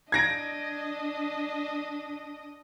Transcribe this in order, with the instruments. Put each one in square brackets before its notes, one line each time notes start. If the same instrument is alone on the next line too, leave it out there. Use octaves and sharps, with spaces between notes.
[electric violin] D4 D#5 [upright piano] G#6 A#6 D7